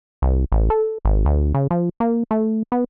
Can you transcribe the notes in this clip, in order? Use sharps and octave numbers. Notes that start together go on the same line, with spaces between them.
C2
A1
A4
G#1
D2
C#3
F3
A#3
A3
B3